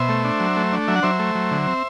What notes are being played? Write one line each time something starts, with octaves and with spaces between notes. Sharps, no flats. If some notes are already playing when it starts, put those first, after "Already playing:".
Already playing: B2 C5 E5
A3
D4
F#3
A3
D4
F#3 E5
F#5
F#3 C5 E5
A3
F#3
D3
C4